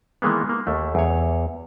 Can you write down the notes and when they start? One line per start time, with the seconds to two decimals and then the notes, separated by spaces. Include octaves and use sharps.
0.22 D#3 E3 G#3 A#3 B3
0.49 A#3
0.67 D#2 A3
0.95 E2 C#5